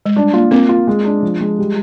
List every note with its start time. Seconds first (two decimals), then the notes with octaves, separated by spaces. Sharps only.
0.06 G#3
0.16 G3 D4
0.34 A#3 F4
0.51 A#3 C4
0.69 F4
0.87 G#3
1.05 D4
1.23 F3
1.40 G#3
1.59 G3